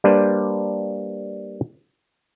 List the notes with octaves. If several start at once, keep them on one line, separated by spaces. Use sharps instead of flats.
G3 A#3 D4 B4 C5